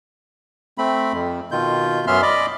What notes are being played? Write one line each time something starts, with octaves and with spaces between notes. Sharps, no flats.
A3 C4 B5
F2
B2 D#3 F4 G6
F#2 B3 C#4 E5 C6 F6
D5 D#5 B5 D6